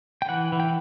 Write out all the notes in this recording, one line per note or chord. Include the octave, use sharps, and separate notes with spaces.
G5
E3 F#5
E3
G5